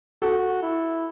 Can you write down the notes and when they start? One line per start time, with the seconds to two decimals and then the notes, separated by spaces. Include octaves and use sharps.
0.22 F#4 A4
0.62 E4